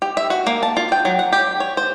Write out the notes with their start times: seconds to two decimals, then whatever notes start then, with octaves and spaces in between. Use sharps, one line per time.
0.02 G4
0.17 E5
0.30 F#4
0.47 A#3
0.63 A5
0.77 F4
0.92 G5
1.05 F#3
1.19 F#5
1.33 G4
1.60 C#5
1.77 C5